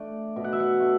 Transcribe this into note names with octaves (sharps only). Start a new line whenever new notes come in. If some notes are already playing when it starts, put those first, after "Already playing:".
Already playing: A3 D4 D5
B2
F#5
E5
F#5
A3 D4